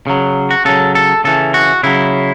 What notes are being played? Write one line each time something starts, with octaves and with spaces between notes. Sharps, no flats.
C#3 F#3
F#4
C#3 F#3 A4
A4
C#3 E3 A4
F#4
C#3 F#3 E4